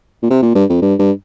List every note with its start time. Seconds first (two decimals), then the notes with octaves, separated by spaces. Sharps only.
0.22 A#2
0.30 C3
0.42 A#2
0.55 G2
0.69 F2
0.82 G2
0.99 G2